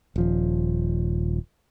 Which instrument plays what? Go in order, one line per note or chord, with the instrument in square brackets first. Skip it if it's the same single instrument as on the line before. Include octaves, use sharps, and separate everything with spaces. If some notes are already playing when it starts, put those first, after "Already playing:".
[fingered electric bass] D#1 F3